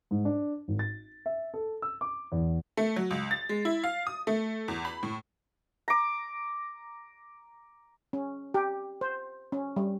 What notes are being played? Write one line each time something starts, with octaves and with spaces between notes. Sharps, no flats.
G#2
D4
G#1
A6
E5
A4
E6
D6
E2
A3
F#3
C#2
A6
G#3
E4
F5
D#6
A3
E2
B5
A2
A#5 D6
C#4
G4
C5
C#4
G3